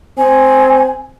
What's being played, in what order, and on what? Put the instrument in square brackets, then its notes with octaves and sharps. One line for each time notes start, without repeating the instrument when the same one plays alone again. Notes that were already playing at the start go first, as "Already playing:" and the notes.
[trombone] C4 [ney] G#5